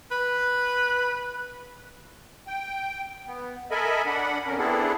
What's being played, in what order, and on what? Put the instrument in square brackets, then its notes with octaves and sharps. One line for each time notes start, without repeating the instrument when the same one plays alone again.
[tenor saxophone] B4
[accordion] G5
B3
A4 A#4 D#5 E5 G#5 B5
D4 F#5 B5
F2 C#4 A#4
B3 C4 D4 E4 G#4 A4